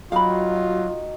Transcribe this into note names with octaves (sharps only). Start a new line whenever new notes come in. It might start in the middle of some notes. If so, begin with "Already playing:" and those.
F#3 D#4 F4 F#4 F5 G5 B5